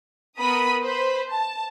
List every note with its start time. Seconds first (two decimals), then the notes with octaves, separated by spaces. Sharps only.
0.39 B3 A#4 B5 D#6
0.82 B4 C5 B5
1.30 A5